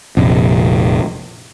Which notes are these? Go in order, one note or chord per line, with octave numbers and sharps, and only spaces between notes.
F1 A#1